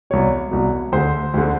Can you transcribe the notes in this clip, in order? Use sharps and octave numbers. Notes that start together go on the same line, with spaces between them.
C2 B2 C#5
C2 B2
D2 D3 C5
D2 D3